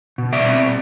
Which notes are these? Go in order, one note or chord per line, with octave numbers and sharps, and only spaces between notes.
B2
D5 E5
C4